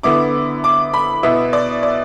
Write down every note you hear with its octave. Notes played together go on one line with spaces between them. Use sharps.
D3 B3 E4 D6
D6
B5
B2 B3 E4 E5
D5
D5